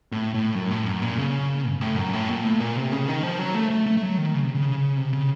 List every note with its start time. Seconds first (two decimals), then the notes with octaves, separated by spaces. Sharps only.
0.12 A2
0.34 A2
0.55 F#2
0.71 A2
0.87 F#2
1.02 A#2
1.18 C#3
1.70 F#2
1.81 A2
1.96 F#2
2.13 A2
2.29 A#2
2.44 A2
2.60 A#2
2.76 C3
2.92 C#3
3.08 D#3
3.23 F3
3.39 F#3
3.55 A3
3.70 A3
3.86 A3
3.97 A3
4.02 F#3
4.18 D#3
4.34 C#3
4.44 C3
4.55 C#3
4.97 C3
5.13 C#3